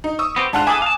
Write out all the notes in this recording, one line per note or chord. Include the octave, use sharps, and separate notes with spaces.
D#4
C#6 D#6 E6
B3 C4 G4
G#2 D4 F4 F#5 A5 F#6
E4 G#4 A4 G#5 D6 D#6
F5 A5